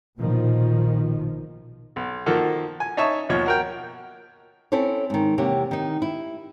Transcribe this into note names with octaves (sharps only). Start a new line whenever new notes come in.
A#1 B2 D#3 F3
B1
D#3 F3 A#3 F#4 A4
G#5
D#4 C#5 E5 A5 C#6 D#6
D#2 B2 F3 C#5
F#4 A#4 G5
C4 C#4 E4 A4 C5 C#5
G#2 D#3
E2 C3 A#3 G4 C#5 F#5
D#3 D#4
E4